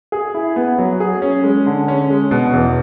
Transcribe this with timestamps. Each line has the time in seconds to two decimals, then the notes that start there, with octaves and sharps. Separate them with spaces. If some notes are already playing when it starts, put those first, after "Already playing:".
0.12 G#4
0.34 E4
0.56 B3
0.78 F#3
1.00 G#4
1.22 C#4
1.44 G#3
1.66 D3
1.88 C#4
2.10 G#3
2.31 B2
2.53 E2